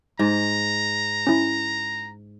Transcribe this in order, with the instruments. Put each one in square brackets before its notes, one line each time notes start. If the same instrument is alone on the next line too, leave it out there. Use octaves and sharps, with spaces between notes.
[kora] G#2 [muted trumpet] A#5
[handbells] C#4 E4